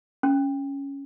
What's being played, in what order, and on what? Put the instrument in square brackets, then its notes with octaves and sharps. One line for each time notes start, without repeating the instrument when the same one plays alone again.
[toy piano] C#4